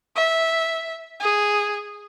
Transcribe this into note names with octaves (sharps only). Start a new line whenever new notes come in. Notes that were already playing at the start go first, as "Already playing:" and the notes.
E5
G#4